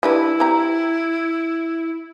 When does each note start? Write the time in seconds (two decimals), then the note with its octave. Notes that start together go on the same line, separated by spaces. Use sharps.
0.03 G3 D4 E4 B4
0.40 C4 G4 A#5